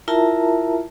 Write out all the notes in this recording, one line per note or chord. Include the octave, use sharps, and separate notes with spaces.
E4 F4 A#4 E5 A5 A#5